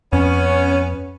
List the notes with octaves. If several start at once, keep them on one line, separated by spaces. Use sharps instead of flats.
F2 B3 C#4